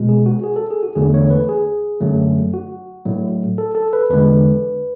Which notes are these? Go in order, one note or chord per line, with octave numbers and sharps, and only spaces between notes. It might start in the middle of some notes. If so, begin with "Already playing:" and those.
Already playing: B2 G#3
G#4
F#4
G#4
A4
G#4
F#4
E2 D3 A3 G#4
C#5
B4
G#4
F#2 D3 F#3 A3
F#4
A2 F#3 A3
A4
A4
B4
E2 D3 G#3 B4